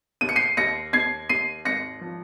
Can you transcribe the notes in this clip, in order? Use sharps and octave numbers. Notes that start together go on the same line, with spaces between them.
D#2 D#7
C#7
C7 D#7
D#2 A#6 C#7
D#2 G#6 C7
D#2 C7 D#7
G#1 A#6 C#7
F3